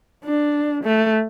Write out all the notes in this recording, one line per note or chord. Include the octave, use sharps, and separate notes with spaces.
D4
A3